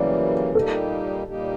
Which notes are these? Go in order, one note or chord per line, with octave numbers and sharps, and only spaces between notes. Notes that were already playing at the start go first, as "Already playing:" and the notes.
Already playing: F#2 C#3 E3 G3 A#3 D5
A#2 G3 A#3 D#4 G4 A4
A#2 G3 A#3 D#4 G4